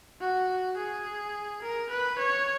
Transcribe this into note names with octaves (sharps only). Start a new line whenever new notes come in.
F#4
G#4
A#4
B4
C#5